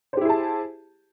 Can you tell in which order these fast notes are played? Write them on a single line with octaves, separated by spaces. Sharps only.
C5 G4 E4 G#4 A5